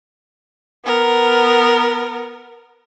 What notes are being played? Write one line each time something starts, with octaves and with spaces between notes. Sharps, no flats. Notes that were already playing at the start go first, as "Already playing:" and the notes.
B3 A#4